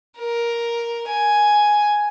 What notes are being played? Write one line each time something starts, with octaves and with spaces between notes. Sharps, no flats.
A#4
G#5